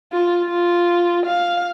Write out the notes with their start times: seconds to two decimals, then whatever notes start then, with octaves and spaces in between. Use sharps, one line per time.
0.12 F4
0.45 F4
1.26 F5